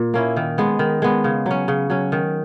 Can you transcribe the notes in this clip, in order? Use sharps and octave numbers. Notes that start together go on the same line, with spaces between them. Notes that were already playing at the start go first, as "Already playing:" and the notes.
Already playing: A#2
A#3 C#4 E4
D#3
G#3 B3
D#3
G#3 B3
C#3
F#3 C#4
C#3
F#3 C#4
D#3